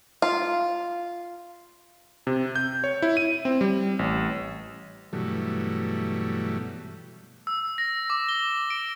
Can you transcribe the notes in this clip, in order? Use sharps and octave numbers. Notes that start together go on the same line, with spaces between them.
F4
C3
G6
C#5
E4
D#7
C4
G3
A1
G2 B2 E3 F#3 G3 A3
E6
A#6
D6
G7
D7